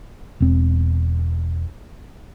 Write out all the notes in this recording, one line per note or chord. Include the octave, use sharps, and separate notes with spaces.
E1 C4